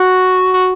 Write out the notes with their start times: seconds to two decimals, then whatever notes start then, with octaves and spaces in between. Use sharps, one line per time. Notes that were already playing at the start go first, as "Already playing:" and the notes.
Already playing: F#4
0.54 F#4